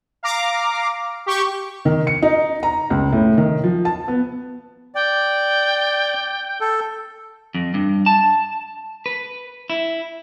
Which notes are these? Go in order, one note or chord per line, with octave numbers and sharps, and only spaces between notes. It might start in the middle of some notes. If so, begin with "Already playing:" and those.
F5 A#5 D6
G4 C#6
D#3
C#7
D#4
A#5
C#2
A2
D#3
F3
A5
B3
D5 G5
A4
F2
G2
A5
B4
E4